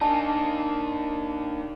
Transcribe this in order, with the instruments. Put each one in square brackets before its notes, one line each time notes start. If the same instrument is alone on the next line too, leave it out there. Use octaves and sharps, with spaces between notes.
[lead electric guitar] A#3 D#4 [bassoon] D4 [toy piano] G#5 A5